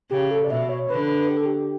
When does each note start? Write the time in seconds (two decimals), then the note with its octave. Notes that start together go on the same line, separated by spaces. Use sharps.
0.11 C#3 G4
0.31 A4
0.45 D5
0.50 B2 E5
0.69 C#5
0.90 D3 B4
1.29 G4
1.37 A4
1.45 G4